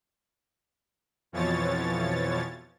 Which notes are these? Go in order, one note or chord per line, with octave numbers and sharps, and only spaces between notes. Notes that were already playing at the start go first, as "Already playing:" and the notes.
F2 B2 E3 F3 C#5 A6